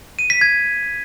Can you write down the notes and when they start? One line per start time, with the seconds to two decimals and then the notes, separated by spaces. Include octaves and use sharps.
0.19 D#7
0.30 B6
0.41 G#6